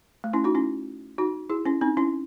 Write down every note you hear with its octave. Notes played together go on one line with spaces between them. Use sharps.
A3
C#4 E4
D#4 F#4
C#4 E4
D#4 F#4
E4 G#4
C#4 E4
C4 D#4
C#4 E4